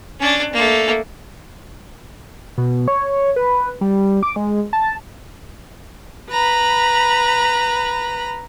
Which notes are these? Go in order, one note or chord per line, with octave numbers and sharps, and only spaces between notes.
C#4 D4
A3 A#3
B2
C#5
B4
G3
D6
G#3
A5
B4 A#5 B5